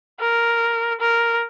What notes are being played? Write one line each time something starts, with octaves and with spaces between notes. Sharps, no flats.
A#4
A#4